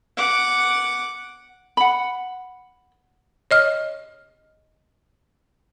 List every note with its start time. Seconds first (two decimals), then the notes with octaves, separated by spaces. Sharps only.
0.17 F#5 D6
1.77 F#5 B5
3.51 C#5 D#5 F6